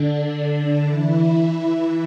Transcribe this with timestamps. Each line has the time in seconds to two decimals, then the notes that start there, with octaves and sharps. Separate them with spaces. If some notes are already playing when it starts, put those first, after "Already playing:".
Already playing: D3 D4
0.86 E3 E4